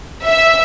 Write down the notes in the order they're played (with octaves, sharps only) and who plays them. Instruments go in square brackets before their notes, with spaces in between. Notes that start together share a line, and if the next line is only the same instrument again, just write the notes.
[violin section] E5